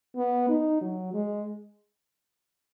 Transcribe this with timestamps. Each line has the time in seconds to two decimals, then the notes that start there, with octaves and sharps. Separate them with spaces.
0.16 B3
0.49 D#4
0.81 F#3
1.14 G#3